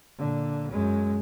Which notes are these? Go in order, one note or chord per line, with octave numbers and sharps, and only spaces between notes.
A#2 D3
F#2 G#3